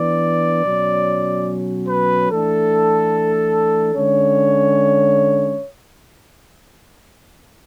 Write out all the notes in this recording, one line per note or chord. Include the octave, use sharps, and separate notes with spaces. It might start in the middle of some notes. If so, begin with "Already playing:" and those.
Already playing: E3 B3 D4 D5
B2 F#3 C#4
B4
E3 A3 D4 A4
D3 G#3 C#4 C#5